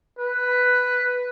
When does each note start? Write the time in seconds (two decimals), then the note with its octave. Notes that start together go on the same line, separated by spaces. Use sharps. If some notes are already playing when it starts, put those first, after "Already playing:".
0.19 B4